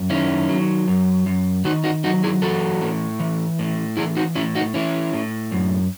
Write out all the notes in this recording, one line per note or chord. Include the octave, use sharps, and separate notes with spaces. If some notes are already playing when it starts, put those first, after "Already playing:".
Already playing: F#2
D#3 C#4 E4
F#3
F#2
F#2
D#3 D#4 F#4
D#4 F#4
F#3 D#4 F#4
E4 G#4
E3 F#4 A4
A2
E3
A2
E3 E4 G#4
D#4 F#4
A2 C#4 E4
D#4 F#4
E3 C#4 E4
A2
F#2